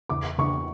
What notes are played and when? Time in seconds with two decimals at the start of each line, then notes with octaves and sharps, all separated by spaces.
0.09 E2 D6
0.38 E2 C#6